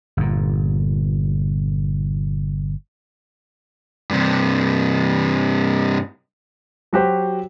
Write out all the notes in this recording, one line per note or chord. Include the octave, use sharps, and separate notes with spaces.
G1 A#2
G2 C3
F#3 F#4 G4 C5